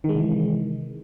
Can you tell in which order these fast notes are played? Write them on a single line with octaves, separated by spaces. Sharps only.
D#3 G#3 C3 E3